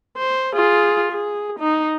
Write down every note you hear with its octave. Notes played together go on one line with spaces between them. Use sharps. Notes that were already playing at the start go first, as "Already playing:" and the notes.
C5
F4 G#4
G#4
D#4